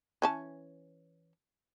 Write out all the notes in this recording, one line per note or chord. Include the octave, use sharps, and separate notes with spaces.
E3 C#4 A5